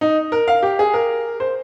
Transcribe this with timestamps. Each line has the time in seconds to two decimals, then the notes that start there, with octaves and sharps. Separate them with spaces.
0.01 D#4
0.32 A#4
0.48 F5
0.63 G4
0.79 G#4
0.94 A#4
1.40 C5